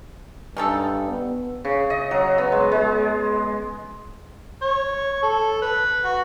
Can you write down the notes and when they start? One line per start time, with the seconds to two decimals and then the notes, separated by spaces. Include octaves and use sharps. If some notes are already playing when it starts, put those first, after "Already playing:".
0.57 G2 C#4 D#4 A4
1.08 B3
1.65 C#3
1.90 D#5
2.11 F#3
2.38 B3
2.52 G#3
2.72 G#3
4.62 C#5
5.23 A4
5.62 B4
6.05 F#4